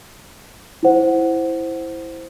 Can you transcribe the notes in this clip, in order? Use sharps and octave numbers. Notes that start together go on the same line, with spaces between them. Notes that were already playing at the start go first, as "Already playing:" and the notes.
E4 C5 F#5